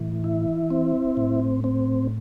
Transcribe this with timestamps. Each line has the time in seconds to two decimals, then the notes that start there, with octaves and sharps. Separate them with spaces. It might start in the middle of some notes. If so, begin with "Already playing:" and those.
Already playing: A2 E3
0.24 E4
0.70 C4
1.17 A2
1.64 C4